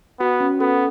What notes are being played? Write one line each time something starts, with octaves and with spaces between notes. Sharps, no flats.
B3 F#4
C#4
B3 A4